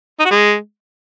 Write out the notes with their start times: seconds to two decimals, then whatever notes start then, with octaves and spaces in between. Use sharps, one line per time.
0.20 D#4
0.25 F#4
0.31 G#3